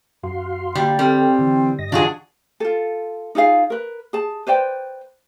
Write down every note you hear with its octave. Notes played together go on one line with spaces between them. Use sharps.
F#2 F#4 F5 C6
D3 G3 A#3
G3 C4 A4 F6
D3 E3
G2 D#5 A#6
D3 E3 F3 D4 F4 F#4 G#4
F4 A4
D#4 F4 G#4 F5
A#4 B4
G#4 A5
B4 C5 D5 G5